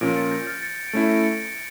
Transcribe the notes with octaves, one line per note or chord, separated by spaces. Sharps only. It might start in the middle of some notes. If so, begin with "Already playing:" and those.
A#2 F3 C#4 A#6 D7
A6 C#7
G6 A#6
F6 A6
A6 C#7
D7
A3 C#4 E4 A6 C#7
A#6 D7
A6 C#7